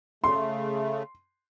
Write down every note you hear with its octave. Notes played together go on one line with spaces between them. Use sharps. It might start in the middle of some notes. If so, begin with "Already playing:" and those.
C#3 A3 C6